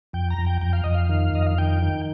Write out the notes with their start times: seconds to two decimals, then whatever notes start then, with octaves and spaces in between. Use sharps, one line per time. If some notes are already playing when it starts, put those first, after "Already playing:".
0.13 F2 G5
0.30 A#5
0.38 F2
0.46 G5
0.61 F2 G5
0.73 F5
0.84 F2 D#5
0.94 F5
1.09 D#3
1.34 F2 D#5
1.47 F5
1.58 D#3 G5
1.82 D#3